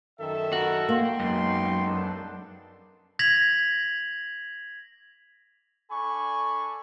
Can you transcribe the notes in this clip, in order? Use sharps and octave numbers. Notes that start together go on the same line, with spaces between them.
F#2 D#3 A4 E5
E4 F#4 A#4
A#3 G5 C6
B1 F#2 G#3 D#4
B3 D4 A4
G#6 A#6 B6 F7 F#7
D4 A4 G#5 B5 C#6